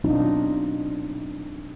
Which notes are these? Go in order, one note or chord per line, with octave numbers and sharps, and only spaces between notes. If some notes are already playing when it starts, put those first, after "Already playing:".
B2 F#3 C4 D4 D#4 F4